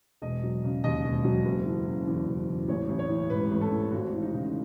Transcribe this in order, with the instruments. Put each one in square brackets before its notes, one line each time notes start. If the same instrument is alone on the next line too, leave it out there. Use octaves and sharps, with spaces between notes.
[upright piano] E1 D#5
F#3
C#3
D#2 D#5
E1
F#3
F#1
E3
C#3
E2
F#1
E3
A1 C#5
A1
C#5
E3
G#2 B4
A1
A4
A1
G#1 F#4
E3
D#4
C#3